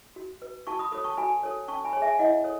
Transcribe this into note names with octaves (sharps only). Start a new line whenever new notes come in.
F#4
B4
F#4 A5 C#6
B5 D#6
A4 C#5 B5 D#6
A5 C#6
F#4 G#5 B5
A4 C#5
C#4 A5 C#6
G#5 B5
G#4 C#5
E5 G#5
E4 D#5 F#5
A4 C#5